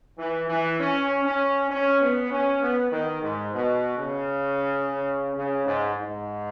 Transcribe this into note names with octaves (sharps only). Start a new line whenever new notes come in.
E3
E3
C#4
C#4
C#4
B3
C#4
B3
D#3
G#2
B2
C#3
C#3
G#2
G#2